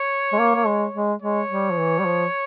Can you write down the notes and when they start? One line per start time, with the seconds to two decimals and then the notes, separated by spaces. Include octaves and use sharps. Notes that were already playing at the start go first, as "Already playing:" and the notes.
Already playing: C#5
0.33 G#3
0.39 A#3
0.55 A#3
0.66 G#3
0.94 G#3
1.22 G#3 C#5
1.50 G3
1.71 F3
1.78 E3
1.99 G3
2.06 F3